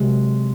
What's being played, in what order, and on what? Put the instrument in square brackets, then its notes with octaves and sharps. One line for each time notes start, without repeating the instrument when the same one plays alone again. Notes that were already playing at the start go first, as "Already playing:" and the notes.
Already playing: [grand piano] C3 F#3 C4 [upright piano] G#3